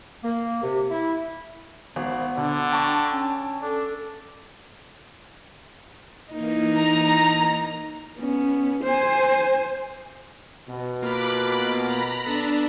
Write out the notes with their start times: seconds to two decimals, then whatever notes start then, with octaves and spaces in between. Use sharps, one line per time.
0.23 A#3
0.63 C3
0.90 E4
1.96 G#1 B3
2.37 D2 D3 D4
2.72 G5 A5 C#6
3.13 C#4
3.62 D4 A4
6.32 E3 A#3 D#4
6.78 A#5
8.18 B3 C#4
8.84 C5 G#5
10.68 B2
11.02 A#3 F4 B5 D6 F#6
11.86 A#5 B5
12.26 B3 D4 A4